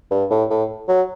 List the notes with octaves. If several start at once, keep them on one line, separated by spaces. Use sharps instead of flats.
G2
A2
A2
F#3